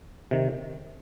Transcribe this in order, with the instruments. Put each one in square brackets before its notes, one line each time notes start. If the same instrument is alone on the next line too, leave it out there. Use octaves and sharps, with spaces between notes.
[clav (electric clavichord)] C3 D#3